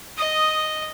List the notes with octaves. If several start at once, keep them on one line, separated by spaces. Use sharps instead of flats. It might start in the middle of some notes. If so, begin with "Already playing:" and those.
D#5 D#6